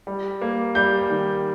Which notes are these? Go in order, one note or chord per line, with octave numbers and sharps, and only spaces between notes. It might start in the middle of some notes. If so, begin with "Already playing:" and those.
G3
A#3
G3 G6
D#3